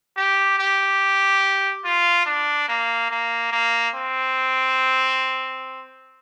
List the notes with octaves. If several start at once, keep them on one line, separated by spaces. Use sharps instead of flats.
G4
G4
F4
D4
A#3
A#3
A#3
C4